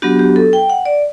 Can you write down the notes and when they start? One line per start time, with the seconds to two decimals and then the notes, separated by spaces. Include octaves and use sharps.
0.02 F#3 B3 D4 F#4 G4
0.19 G4
0.36 A4
0.53 G5
0.70 F#5
0.85 D5